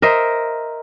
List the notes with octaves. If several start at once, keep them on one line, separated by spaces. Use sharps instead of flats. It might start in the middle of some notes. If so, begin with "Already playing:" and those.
A#4 C5 D#5 E5